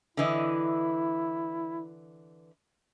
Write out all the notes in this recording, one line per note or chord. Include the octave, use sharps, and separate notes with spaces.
D3 E3 E4 D#5